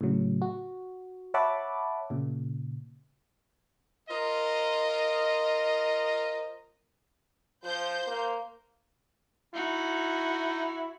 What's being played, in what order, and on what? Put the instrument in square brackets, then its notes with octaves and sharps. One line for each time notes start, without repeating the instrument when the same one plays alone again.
[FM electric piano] A2 C#3 F#3
F#4
C#5 E5 F#5 A5 B5 D6
A#2 C#3
[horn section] F4 A#4 C5 D#5
[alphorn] F3 [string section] C5 G6
[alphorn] A#3
[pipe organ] D#4 [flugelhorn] E4 [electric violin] F#4